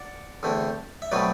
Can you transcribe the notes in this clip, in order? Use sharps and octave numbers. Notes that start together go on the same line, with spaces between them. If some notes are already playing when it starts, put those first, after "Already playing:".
Already playing: D5 F#5
E2 D3 A3 C4
E5
B2 F#3 A3 C4 B4 D5